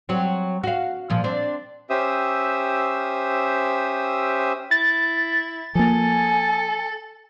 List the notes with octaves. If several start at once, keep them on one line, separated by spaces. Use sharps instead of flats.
F#3 C4
F#4 F5
A#2 F3
C4 D4
C#4 G4 C5 E5 D#6 E6
E4 A6
F3 A#3 A4 G#5